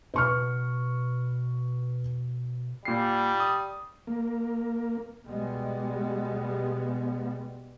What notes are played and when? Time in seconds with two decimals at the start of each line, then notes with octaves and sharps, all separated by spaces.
0.14 B2 B4 C#6 F6
2.85 A#2 G3 C7
3.40 D#6
4.07 A#3
5.25 B2 G3 G#3 B3